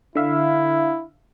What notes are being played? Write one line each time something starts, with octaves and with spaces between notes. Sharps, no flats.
D3 E4 E5 F5